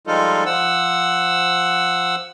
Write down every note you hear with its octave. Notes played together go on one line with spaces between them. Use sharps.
F3 G3 G#3 D#4 F4 A4
F3 F#5 E6